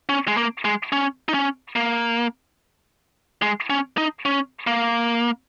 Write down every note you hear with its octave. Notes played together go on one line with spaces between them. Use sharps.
C#4
G#3
A#3
G#3
C#4
D#4
C#4
A#3
G#3
C#4
D#4
C#4
A#3